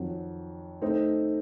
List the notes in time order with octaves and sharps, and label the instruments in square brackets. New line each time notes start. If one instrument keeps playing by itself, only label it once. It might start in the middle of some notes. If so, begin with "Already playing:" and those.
Already playing: [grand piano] F2 D#3 F#3
A3 C4 D#4